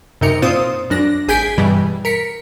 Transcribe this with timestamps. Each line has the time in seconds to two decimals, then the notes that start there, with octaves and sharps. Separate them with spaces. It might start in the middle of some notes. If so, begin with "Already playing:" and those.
0.21 F#2 C3 D#4 A#4 C#7
0.42 A#2 C4 F4 C5 D#6
0.90 F#2 D4 A#6
1.28 G#1 G#4 G#5 G6 B6 D7
1.58 G2 B2 E3 G3
2.05 A#4 B6 C#7